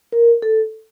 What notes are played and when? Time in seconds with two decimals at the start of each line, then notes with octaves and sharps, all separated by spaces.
0.12 A#4
0.42 A4